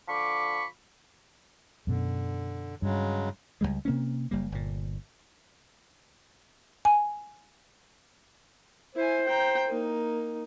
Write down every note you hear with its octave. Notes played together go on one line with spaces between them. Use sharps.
D3 F3 B5 C#6 D6
F#2 B2 D3
G2 C#3 F#3 G#3
C#2 F#2 G3 G#3
C3 A#3 C4 C#4
F#1 G3 A#3
G1 A#2
G#5
E4 C5 G#5
G5 A#5
A#3 D#4